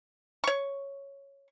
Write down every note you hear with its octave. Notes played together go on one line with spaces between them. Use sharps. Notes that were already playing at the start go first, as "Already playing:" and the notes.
C#5 C#6